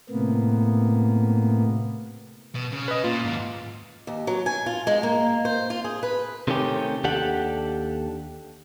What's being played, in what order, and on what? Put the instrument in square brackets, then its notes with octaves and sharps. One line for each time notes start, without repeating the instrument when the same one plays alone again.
[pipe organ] A2 C3 A#3 B3
[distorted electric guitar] B2
C#3
[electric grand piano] B4 D#5
[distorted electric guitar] A#2 [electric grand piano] F4
[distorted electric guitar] D#2 G#2
[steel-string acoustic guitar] D#2
F#3
G#5
F4
G#3
A#3
C5
F4
G#4
B4
[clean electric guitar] C3 D#3 A3 C#4 G4
D#2 D4 G4 A4 F#5